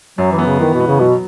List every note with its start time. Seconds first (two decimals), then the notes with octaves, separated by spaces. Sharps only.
0.18 F#2 F#3
0.32 E3
0.38 B3
0.46 C#3
0.60 D#3 E3
0.74 B2
0.80 B3
0.87 C#3
1.00 B2 F#3